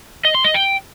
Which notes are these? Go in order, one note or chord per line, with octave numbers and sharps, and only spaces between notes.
D#5
C6
D#5
G5